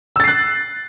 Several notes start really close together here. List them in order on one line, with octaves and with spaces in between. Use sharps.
E6 A6 C7 F#6